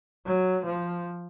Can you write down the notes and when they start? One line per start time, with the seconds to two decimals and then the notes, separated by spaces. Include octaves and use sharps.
0.26 F#3
0.66 F3